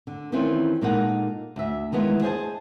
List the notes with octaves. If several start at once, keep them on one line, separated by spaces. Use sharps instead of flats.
D3
D#3 E3 C4 C#4 F4
A#2 G#3 A#3 D#4 A4 F#5
D2 E5
D#3 E3 G#3 B3 F4
G#4 C5 D#5 A5